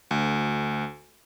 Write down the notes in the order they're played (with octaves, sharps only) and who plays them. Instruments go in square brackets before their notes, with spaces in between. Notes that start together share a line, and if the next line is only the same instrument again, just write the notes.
[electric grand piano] D2